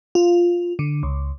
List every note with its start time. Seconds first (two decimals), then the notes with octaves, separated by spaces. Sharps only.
0.15 F4
0.79 D3
1.03 C#2